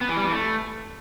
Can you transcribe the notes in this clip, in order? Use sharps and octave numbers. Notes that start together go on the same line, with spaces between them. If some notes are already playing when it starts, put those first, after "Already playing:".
B3
E3
G3
E3
A3